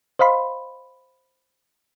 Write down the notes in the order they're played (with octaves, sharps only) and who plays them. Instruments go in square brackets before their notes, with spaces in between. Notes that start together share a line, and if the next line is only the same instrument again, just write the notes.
[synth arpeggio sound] C5 D#5 F5 B5 C6